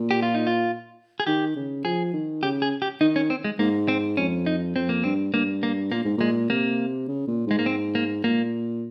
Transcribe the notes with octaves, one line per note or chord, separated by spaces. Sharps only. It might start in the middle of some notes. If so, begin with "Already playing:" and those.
Already playing: A#2
G4
F4
D#4
F4
G#4
D#3 G4
C#3
F3 G#4
D#3
C#3 G4
G#4
G4
D#3 D#4
C#4
C4
G#3
G#2 A#3
C4
F2 C#4
D#4
F2 C4
A#3
G2 C4
G2 A#3
A#3
A#2 A#3
G#2
A#2 G#3
C3 A#3
C#3
A#2
G#2 G#3
A#3
C4
A#3
A#2 A#3